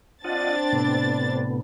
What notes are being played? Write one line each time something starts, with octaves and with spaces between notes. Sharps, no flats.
C4 D4 F4 D#5 F#5 A6
A2 C3 B3